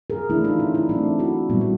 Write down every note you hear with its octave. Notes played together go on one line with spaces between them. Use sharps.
G#4 A#4
E3 A3 D4 E4
D#4 F4
C#4 D#4
D4 E4
E3 A3 C4 D4
E4 F#4
A#2 G3 B3
F#4